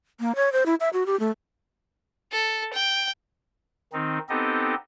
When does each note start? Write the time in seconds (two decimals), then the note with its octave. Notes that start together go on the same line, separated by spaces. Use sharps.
0.20 A#3
0.35 C#5
0.52 C5
0.66 E4
0.80 E5
0.93 F#4
1.06 G4
1.19 A3
2.33 A4
2.74 G5
3.93 D#3 C4 D#4
4.29 B3 C4 D#4 G4 A4 D#5